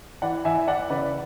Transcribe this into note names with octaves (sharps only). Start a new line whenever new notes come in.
E3 D5 F#5
E3 E5 G#5
E3 D5 F#5
C#3 B4 D5